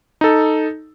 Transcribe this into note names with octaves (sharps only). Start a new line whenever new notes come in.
D#4 A4